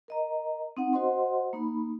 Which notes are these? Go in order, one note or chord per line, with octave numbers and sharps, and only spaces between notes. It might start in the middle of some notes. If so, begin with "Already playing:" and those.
A#4 D#5 A#5
C4 D#4 F#5
F#4 C5 D#5 F#5 C6
A#3 D#4 B5